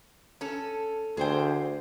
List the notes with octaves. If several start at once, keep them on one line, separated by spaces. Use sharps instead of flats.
C#4 A4
D2 G#4 C5 G5